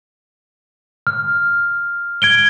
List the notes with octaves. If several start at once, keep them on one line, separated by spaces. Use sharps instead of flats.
F6
G#6 D7 G7